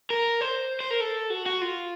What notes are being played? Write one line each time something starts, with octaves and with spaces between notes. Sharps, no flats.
A#4
C5
C5
A#4
A4
F#4
F#4
F4